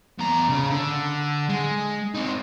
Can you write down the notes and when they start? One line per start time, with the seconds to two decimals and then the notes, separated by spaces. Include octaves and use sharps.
0.19 E2 A#5
0.49 C#3 C#4
0.71 D3
1.49 G#3
2.14 C4 D#4